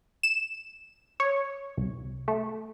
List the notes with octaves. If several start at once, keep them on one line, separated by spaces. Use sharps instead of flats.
E7
C#5
C2
A3